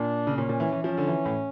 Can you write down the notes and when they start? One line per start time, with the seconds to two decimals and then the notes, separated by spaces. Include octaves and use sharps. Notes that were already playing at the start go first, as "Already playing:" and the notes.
Already playing: A#2 D4
0.27 C#3
0.38 A#2 C#4
0.49 A#2
0.60 E3
0.72 E3
0.83 F3 C#4
0.98 D3
1.07 E3
1.25 A2